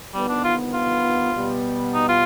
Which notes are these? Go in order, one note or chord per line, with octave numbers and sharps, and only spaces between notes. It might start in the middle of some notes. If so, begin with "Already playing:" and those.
G1 F2 D#3 G3 B3 D#4
D4
F4
F4
B2 G3 B3
D#4
F4